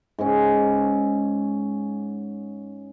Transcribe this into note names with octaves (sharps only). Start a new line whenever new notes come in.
G#2 C#4